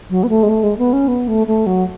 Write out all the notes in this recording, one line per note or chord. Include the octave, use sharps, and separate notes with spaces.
F#3
B3
A3
G#3
A3
G#3
B3
C#4
B3
A3
A3
F#3